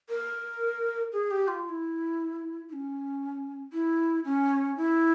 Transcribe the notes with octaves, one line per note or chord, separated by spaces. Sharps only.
A#4
G#4
G4
F4
F4
E4
E4
C#4
E4
C#4
E4